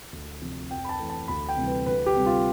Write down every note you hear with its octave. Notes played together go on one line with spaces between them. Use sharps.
D2
C3 F3
F2 G5
B5
A5
E3 A3
A5
D2 B5
G5
C3 E3 G3
B4
D2 B4
G4
C3 G3
F4